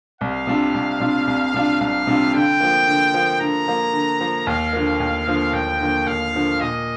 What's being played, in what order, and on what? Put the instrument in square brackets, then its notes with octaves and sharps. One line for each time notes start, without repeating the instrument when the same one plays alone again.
[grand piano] C2 [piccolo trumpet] F5
[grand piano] C3 G3 D4 F4
C2
C3 G3 D4 F4
C2
C3 G3 D4 F4
[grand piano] C2 [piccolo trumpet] F5
[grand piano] C3 G3 D4 F4
[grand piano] D3 [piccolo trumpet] G5
[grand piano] F3 A#3
D3
F3 A#3
[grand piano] D3 [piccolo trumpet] A#5
[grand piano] F3 A#3
D3
F3 A#3
[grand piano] D#2 [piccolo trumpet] F5
[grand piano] D3 F3 A#3
D#2
D3 F3 A#3
[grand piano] D#2 [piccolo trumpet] G5
[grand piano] D3 F3 A#3
[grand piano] D#2 [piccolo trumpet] F5
[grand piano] D3 F3 A#3
[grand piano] A#2 [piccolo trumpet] D#5